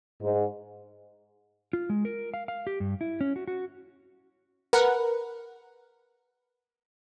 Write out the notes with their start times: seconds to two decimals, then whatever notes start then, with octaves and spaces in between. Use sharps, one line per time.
0.22 G#2
1.73 F4
1.90 G#3
2.05 A#4
2.34 F5
2.48 F5
2.67 G4
2.80 G2
3.01 E4
3.21 C#4
3.36 F#4
3.48 F#4
4.73 A#4 B4 F#5